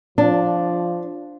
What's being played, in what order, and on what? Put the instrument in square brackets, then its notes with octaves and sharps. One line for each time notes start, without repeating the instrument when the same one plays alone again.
[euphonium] F3 [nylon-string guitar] D4